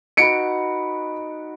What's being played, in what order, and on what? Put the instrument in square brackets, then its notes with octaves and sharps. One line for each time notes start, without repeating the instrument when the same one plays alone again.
[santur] D#4 F#4 B4 [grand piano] C#7 D7